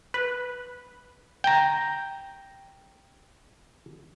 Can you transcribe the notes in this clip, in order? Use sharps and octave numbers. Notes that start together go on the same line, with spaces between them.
B4
G5 A#5